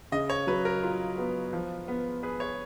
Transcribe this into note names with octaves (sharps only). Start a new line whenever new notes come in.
C#3 D#5
C#5
F#3 B4
A#4
F4
B3
F3
B3
G#4 B4
C#5